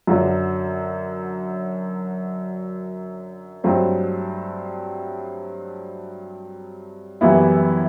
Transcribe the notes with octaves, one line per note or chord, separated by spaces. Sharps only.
F#2 D3 F#3
G2 F#3 A3 C4
F#2 E3 G3 B3 E4